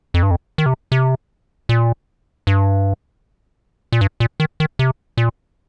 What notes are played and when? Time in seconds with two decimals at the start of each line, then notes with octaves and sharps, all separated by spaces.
0.14 F2
0.23 G2
0.31 F2
0.58 D#3
0.66 C3
0.92 C3
1.69 A#2
2.47 G2
3.92 A#2
4.01 G2
4.20 A#2
4.40 D#3
4.60 D#3
4.79 C3
5.17 A#2